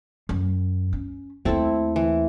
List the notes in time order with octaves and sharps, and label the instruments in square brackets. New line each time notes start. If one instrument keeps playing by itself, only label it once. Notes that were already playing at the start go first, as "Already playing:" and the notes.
[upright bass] F#2
C#4
[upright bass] D#2 A3 [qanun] C4 E4 A4
[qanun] E3